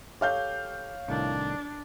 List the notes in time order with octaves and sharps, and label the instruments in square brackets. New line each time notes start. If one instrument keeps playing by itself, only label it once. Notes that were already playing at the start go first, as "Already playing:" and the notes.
[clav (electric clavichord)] G4 A4 [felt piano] C#5 F5 G6
[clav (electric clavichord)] C2 A2 D#3 [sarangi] D4